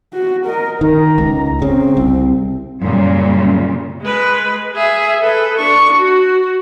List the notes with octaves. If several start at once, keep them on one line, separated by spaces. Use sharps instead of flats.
F#4
A#4 D#5
D#3 A#5
C#2
C#3 C4
C2
F#2 A#2 C#3 G3
G#3 B4
G#4 E5
A4 B4
D4 C#6
F#4